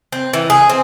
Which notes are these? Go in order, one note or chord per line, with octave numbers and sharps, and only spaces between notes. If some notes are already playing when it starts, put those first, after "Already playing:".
C4
E3
G#4
C4